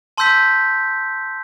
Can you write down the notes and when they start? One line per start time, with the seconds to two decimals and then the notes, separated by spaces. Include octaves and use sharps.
0.18 A5 C6 E6 G6 B6